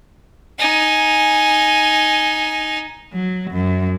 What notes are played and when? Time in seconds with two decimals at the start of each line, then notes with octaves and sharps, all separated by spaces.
0.59 D#4 G#5
3.12 F#3
3.51 F#2